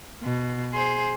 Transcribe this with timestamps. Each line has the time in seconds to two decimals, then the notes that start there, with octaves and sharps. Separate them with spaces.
0.23 B2
0.73 G#4 C5